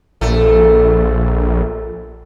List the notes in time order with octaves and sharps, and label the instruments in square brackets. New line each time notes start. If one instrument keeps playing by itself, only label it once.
[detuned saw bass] A#1 [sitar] A3